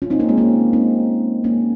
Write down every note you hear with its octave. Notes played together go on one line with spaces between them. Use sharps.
C#4 F4
C4 D#4
A#3 C#4
G#3 C4
A#3 C#4
C4 D#4
A#3 C#4